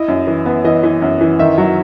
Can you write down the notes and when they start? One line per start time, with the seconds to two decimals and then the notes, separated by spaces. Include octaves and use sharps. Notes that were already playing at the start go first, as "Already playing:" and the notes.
Already playing: E4 D#5
0.08 F#2
0.27 E3
0.46 B3
0.65 E3 D#5
0.83 E3
1.02 F#2
1.21 E3
1.39 D#3 E5
1.58 F#3